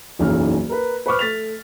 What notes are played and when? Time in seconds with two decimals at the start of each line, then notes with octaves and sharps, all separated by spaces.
0.19 F#1 B1 E2 C#4 D#4 F6
0.69 A#4 B4
1.06 B4 C5 B5 C#6 D6 F6
1.19 A3 A6 B6 F7